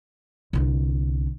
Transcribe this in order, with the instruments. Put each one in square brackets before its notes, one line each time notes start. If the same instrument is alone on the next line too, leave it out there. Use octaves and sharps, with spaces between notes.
[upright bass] C2 D3